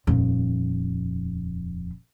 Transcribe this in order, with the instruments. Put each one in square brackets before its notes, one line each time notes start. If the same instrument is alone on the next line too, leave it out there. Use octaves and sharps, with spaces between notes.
[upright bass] D#1 F2